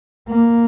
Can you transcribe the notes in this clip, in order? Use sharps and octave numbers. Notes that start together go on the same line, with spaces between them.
A#3